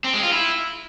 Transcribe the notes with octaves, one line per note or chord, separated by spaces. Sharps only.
C4
G#3
F4
E4